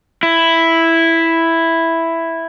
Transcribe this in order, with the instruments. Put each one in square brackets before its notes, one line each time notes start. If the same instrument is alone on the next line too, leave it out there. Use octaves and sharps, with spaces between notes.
[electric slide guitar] E4